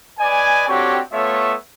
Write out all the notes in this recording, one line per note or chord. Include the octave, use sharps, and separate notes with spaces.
B4 D5 D#5 G#5
C4 D4 F#4 G4 A4 C#5
A3 B3 F4 C#5 E5